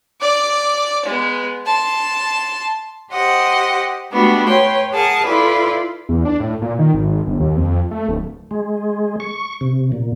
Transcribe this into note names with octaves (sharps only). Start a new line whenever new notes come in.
D5 D6
G#3 B3
A5 C6
G4 C5 D#5 F#5
G#3 A3 B3 D4 F#4 G4
B4 C#5 G5 C6
G#4 A#4 F#5 A5
E4 F4 A4 B4 D5
E2
D4
A2
A#2
D#3
G#1
G1
D#2
F2
A3
D1
G#3
C#6
C3
A#2